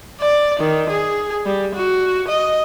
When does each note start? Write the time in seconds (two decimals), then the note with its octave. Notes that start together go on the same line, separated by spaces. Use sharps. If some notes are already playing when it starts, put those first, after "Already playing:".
0.21 D5
0.60 D#3
0.90 G#4
1.46 G3
1.75 F#4
2.28 D#5